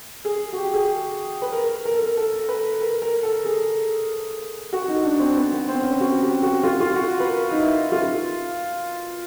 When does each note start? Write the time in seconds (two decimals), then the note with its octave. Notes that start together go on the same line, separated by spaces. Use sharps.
0.25 G#4
0.53 F#4
0.57 G4
0.74 G#4
1.42 B4
1.53 A#4
1.85 A#4
1.94 A4
2.02 A#4
2.17 A4
2.49 B4
2.81 A#4
3.02 A#4
3.23 A4
3.45 G#4
4.73 F#4
4.88 D#4
5.05 D4
5.20 C4
5.37 B3
5.53 B3
5.68 C4
5.83 C#4
6.01 F#4
6.22 G4
6.42 F#4
6.63 F4
6.80 F4
6.95 F#4
7.20 B4
7.27 A#4
7.51 D#4
7.59 E4
7.92 F4